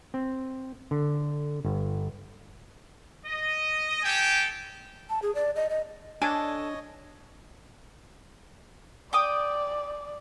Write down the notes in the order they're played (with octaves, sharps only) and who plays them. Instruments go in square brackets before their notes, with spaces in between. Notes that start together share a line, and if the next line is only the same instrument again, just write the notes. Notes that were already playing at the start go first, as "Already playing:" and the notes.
[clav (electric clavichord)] C4
D3
G1
[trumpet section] D#5
G4 A4 G5 G#5
[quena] A5
G#4
D5
D#5
D#5
[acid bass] D4 [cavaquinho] A4 [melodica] C#5 D#5 [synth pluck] G#5
[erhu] D5 [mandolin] G5 D6 D#6